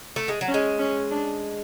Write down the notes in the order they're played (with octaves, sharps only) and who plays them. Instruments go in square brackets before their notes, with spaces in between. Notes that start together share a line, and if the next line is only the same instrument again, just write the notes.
[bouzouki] A3
G#3
F#3
[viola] C#4
[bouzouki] G#3
[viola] C#4
D4